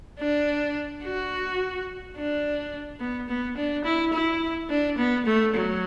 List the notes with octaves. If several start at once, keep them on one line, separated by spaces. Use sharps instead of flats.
D4
F#4
D4
B3
B3
D4
E4
E4
D4
B3
A3
F#3